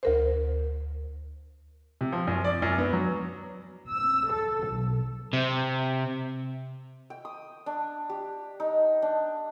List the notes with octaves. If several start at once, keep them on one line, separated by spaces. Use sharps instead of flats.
D2 A#4 C5
C3
F3
F#2
D5
F#2
B3
F#3
E6
A4
B1
C3
G5
D#6
D4
G4
D#4
D4